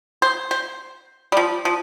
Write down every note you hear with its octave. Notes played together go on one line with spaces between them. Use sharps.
C5
C5
G3
F3
F3